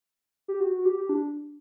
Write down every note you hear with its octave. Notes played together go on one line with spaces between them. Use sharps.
G4
F#4
F#4
G4
G4
D4